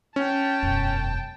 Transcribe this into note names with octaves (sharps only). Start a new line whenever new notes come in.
C#4 G5 A5
E1 F#2